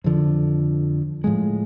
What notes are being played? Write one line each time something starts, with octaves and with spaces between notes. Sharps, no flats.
F2 D3 F3
A2 F3 G#3